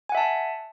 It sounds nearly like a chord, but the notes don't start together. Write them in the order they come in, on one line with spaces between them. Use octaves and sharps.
G#5 F#5 E5 A5